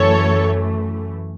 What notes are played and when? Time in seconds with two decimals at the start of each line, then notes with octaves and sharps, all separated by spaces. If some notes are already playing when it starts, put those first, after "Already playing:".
Already playing: F#2 E3 A3 A4 C#5